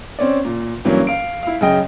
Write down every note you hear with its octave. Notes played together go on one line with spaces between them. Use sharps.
C4 C#4 D5
A#2
G2 E3 F#3 A#3 C#4
F5 D7
E4 F5
F#2 C#3 D#5 G5